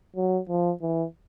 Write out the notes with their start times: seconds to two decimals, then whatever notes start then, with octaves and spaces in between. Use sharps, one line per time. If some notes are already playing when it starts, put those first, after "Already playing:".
0.17 F#3
0.49 F3
0.82 E3